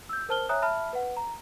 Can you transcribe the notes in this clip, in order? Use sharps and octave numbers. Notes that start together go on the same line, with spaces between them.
E6 G6
A#4 C5 A5 F6 G7
C#5 E5 G#5 A#5 D#6 F#6
E5 A5 B5 F6
B4 F#5
A#5